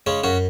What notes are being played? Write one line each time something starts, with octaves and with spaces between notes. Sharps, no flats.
C#3 G#3 C#4
F#2 C#4 F#4